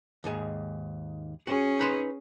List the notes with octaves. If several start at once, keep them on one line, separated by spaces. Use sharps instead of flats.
D#2 G#2 G#4
C#4 F#4 G#4
D#4 B4 C6